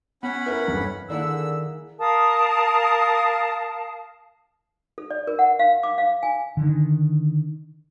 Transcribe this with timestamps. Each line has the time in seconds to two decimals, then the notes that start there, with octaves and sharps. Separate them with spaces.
0.23 B3 C#4 F#5 B5
0.46 E4 A#4 B4
0.67 F1 G2 E3
1.10 D3 D#3 A#3 E4 G#4 F#5 E6
1.99 A#4 F5 A5 D#6
4.98 A4
5.11 D5
5.27 A#4
5.39 F#5
5.59 F5
5.83 D6
5.98 F5
6.23 G#5
6.57 D3 D#3